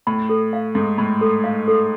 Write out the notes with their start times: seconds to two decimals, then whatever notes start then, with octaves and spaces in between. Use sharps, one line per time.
0.07 A2 B5
0.29 A4
0.53 F5
0.75 G#2 A4
0.98 A2 B5
1.21 A4
1.44 F5
1.68 A4